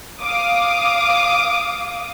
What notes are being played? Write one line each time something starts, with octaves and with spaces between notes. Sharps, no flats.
F5 D6 D#6